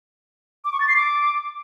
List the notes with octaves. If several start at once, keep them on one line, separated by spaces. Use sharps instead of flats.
D6
C#6
A6
C7
D6